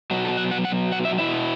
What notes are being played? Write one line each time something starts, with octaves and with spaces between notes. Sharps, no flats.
B2 F#3 B3 F#4
A4
F#5
F#5
F#5
F#5
E5
B2 B3 E4 E5